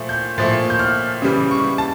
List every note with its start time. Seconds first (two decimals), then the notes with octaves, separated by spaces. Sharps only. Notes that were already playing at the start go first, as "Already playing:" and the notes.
Already playing: A#2 F3 A3
0.09 G6
0.38 A#2 F3 A3 A6
0.70 G6
0.79 F6
1.22 C#3 E3 G3
1.51 C#6
1.78 A5